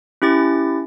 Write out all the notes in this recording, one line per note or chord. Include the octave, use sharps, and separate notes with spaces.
C#4 E4 G4 A6